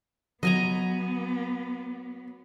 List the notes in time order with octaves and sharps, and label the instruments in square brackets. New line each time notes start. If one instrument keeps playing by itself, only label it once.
[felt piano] F#3 [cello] B3 [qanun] D#5 G#5 A#5